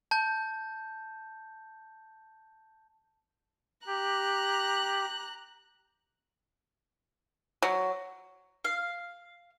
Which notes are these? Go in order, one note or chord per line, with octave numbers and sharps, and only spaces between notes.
A5 G6
G4 A#5 F#6
F#3
F5